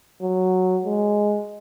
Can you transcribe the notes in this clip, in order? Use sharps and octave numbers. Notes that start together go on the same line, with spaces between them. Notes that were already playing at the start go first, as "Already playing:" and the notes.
F#3
G#3